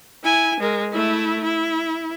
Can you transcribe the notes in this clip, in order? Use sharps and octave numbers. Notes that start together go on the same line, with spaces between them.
E4 G#5
G#3 A#4
A3 E4
E4